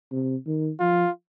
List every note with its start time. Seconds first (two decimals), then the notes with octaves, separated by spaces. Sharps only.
0.12 C3
0.47 D#3
0.80 F3 F4